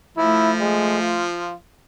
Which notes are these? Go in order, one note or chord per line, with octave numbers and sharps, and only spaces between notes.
F3 A3 E4
G#3
F4